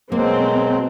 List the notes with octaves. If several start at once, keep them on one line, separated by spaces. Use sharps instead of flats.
B2 F#3 G#3 A#3 C4